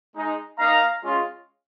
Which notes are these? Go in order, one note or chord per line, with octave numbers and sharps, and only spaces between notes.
G#3 D#4
A#3 D#4 F5 A#5
G#3 C#4 F4